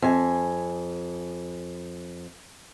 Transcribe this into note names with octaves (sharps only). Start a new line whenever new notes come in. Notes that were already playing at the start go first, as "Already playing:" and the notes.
F2 G#5